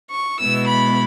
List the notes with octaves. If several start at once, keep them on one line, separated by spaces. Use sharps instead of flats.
C#6
B2 G#3 B3 E4 E6
B5